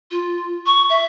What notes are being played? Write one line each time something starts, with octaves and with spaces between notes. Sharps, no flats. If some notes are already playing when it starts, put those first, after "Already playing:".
F4
C#6
E5